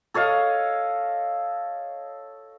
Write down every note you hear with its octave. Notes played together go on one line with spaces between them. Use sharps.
A4 C#5 D#5 F5